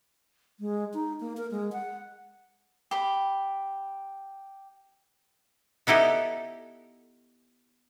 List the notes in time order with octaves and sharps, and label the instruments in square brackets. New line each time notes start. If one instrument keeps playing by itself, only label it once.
[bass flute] G#3
D#4
A#3
A#4
G#3
F#5
[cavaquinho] G4 B5
[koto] B3 D#4 E4 G4 A4